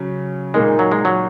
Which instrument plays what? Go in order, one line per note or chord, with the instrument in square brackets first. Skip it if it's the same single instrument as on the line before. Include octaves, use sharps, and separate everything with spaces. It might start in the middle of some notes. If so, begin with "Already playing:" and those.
Already playing: [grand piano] C#3 F#3 C#4
[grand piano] A#2 A#3 D#4 [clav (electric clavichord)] G#3
[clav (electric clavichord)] F#3
G#3
F#3